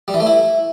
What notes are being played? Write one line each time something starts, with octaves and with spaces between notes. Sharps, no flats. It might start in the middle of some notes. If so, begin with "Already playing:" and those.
G3
E3
A3
E4